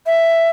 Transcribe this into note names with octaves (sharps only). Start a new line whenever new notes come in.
E5